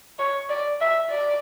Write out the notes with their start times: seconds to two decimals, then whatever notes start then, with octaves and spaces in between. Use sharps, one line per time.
0.19 C#5
0.49 D5
0.81 E5
1.10 D5